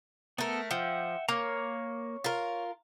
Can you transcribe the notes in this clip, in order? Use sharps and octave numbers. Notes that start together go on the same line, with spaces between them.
A3 B3 A4 A#4
F3 E5 F#5 G5
A#3 C#5 A#5
F4 A#4